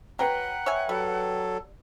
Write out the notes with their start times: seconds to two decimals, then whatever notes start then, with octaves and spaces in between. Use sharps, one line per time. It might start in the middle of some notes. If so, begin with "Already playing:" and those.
0.19 F#3 B4 F#5 G5 A#5
0.66 C#5 E5 G#5
0.89 F#3 G3 A4